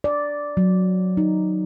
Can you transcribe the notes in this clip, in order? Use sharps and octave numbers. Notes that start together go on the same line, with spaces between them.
D5
F#3
D#4